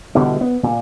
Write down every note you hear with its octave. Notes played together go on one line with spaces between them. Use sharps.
B2 D3 E3 G3
B3
A#2